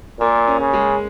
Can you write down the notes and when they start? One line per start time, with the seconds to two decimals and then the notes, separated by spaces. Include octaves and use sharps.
0.20 A#2 A#3
0.47 C#4
0.60 C#3
0.73 G#3